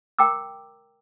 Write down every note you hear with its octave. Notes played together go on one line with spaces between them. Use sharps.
A#4 G5 A#5 D6 E6